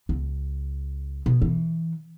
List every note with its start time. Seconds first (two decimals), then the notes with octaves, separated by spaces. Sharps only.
0.09 C#2
1.26 B2
1.42 E3